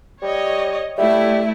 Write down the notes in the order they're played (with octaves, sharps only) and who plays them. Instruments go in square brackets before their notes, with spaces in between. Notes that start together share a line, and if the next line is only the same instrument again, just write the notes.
[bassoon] G3 [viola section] C#5 D#5
[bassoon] G3 [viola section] A3 E4 [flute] E5